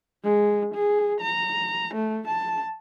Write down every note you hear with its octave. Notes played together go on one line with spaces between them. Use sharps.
G#3
G#4
A#5
A3
A5